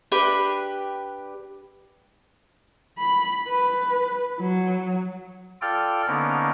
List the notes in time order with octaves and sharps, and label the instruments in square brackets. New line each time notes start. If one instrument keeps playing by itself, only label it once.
[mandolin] D4 G4 B4
[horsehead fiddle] B5
B4
F#3
[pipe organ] F4 A4 D5 G5 F6
D3 A#3 B3 C#4 D#4 A#4